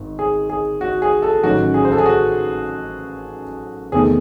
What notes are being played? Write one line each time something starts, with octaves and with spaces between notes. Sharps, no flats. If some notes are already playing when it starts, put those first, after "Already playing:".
Already playing: G#1 D#3
G#4
G#4
F#4
G#4
A4
A1 G#2 D#3 F#3 C#4 F#4
G#4
C5
A4
G#4
F#4
E2 C3 D#3 A3 C4 G#4